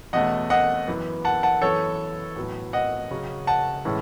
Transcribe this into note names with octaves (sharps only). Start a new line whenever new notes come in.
E2 B2 A3 C#4 D#5 F#5
D#5 F#5
F#2 E3 B3
F#5 A5
F#5 A5
F#2 E3 B3 A4 C#5
A2 F#3 B3
D#5 F#5
C#3 F#3 C#4
F#5 A5
A2 E3 G#3 C#4